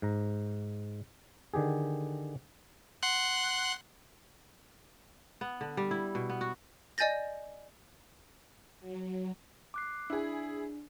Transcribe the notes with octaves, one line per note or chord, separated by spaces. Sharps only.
G#2 A#5
D3 D#3 G4 G#4
F#5 C6 F#6
B3
D3
G3
E4
B2
B3
F#4
D5 D#5 G#5 G6 A6 A#6
F#3
D6 F#6 C7
D4 E4 G#4